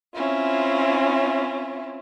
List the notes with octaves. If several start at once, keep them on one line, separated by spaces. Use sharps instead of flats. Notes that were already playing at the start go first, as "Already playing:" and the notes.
C4 C#4 E4 F4